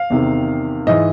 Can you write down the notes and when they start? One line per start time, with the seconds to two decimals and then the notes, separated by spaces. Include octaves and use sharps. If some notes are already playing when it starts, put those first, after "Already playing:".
Already playing: F5
0.10 E2 C3 D#3
0.87 G#2 E3 D#5